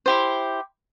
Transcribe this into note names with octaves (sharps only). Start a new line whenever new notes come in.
E4 G4 C5